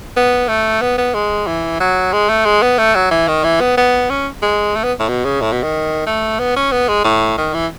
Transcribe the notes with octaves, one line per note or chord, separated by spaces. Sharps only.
B3
A3
B3
B3
G#3
E3
F#3
G#3
A3
G#3
B3
A3
F#3
E3
D#3
E3
B3
B3
C#4
G#3
A3
B3
A2
B2
C#3
A2
B2
D#3
A3
B3
C#4
B3
G#3
A2
D#3
E3